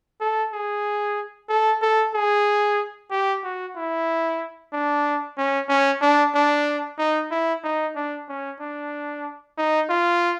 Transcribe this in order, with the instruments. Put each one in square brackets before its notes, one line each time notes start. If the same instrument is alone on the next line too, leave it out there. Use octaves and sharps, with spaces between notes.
[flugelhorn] A4
G#4
A4
A4
G#4
G4
F#4
E4
D4
C#4
C#4
D4
D4
D#4
E4
D#4
D4
C#4
D4
D#4
F4